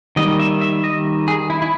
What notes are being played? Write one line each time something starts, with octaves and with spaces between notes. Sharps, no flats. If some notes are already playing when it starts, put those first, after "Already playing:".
D#3 G3 A#3 D#5
E5
E5
D#5
G#4
E4
E4